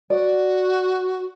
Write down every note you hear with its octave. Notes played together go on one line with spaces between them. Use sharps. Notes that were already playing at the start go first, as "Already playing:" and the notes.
F#4 D5